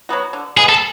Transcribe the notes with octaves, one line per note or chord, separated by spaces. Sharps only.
F#3 B3 F#4
D3
G#3 B3 G#4
A4